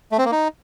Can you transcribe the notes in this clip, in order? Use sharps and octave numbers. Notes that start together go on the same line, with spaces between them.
A3
C4
A#3
D#4